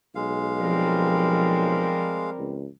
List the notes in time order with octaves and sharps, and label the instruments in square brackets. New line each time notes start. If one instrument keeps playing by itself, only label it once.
[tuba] B1 [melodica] G#3 F5
[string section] F3 [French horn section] G3 C4 A#4
[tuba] C#2